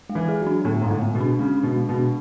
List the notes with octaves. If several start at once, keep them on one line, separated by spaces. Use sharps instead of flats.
G#3
E3
G#4
F#3
D4
A2 B3
G#2 G#3
A2
B3
B2
D4
C#3 G#3
D4
B2
G#3
B2
D4